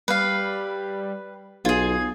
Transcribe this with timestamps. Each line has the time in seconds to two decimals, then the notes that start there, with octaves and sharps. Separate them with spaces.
0.08 G3 B4 F5
1.65 B1 F4 G#4 G#6